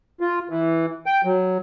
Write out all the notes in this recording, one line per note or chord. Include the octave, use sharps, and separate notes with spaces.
F4
E3
G5
F#3